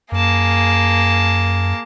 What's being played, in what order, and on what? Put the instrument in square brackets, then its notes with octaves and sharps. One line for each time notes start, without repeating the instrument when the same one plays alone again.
[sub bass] F#2 [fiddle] A#3 [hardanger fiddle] G#4 A5